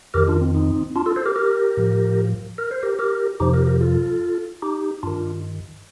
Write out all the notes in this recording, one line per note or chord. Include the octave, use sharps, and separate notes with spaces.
F2 D#3 G4 A#4
D4 F4
C4
C4 D#4
D4 F4
F4 A4
A4 C5
G4 A#4
G4 A#4
A2 F3
A#4
C5
G4 A#4
G4 A#4
F2 C3 F3 D#4 G4
G4 A#4
G4 A#4
F4 A4
D#4 G4
G2 D#3 D4 F4